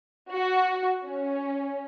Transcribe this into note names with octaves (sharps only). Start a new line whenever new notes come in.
F#4
C#4